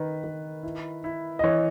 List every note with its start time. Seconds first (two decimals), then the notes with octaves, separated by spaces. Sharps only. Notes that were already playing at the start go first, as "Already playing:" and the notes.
Already playing: D#3 B4
0.24 D#3
0.63 E4
1.04 E4
1.39 D#5
1.43 E3 C#5